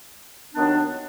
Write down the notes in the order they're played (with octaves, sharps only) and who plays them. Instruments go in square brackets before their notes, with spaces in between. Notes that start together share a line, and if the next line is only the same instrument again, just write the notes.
[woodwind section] D#2 D#3 F#3 B3 D4